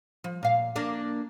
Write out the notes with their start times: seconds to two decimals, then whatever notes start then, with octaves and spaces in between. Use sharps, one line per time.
0.24 F3
0.43 A#2 F5
0.76 A#3 D4 A#4